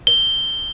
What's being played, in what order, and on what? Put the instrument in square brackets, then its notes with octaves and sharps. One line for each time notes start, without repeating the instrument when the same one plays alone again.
[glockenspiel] G7